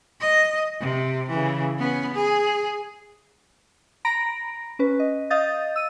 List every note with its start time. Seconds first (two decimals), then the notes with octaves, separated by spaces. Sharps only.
0.21 D#5
0.80 C3
1.29 C#3 E3
1.78 B3 C#4
2.13 G#4
4.05 A#5 B5 A#6 D7
4.79 C#4 B4
5.00 D#5
5.30 D#5 F5 D#6 G6 A6
5.76 E6 D#7